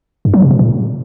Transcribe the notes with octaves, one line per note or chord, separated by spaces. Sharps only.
G2
F#3
C3
B2
A#2